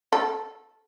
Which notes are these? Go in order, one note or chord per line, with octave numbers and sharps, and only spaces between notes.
A4